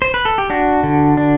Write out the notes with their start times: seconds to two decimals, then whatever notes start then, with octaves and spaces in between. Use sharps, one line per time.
0.02 C5
0.14 B4
0.25 A4
0.38 G4
0.50 D4 F#4
0.83 D3
1.17 D4